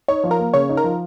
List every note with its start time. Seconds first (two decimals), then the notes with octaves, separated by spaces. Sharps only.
0.08 D#4 C#5
0.23 F3
0.31 A#4
0.39 A#3
0.54 C#3 C#5
0.69 D#4
0.77 A#4
0.84 F3